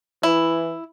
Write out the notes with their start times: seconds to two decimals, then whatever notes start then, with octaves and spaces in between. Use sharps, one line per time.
0.23 E3 E4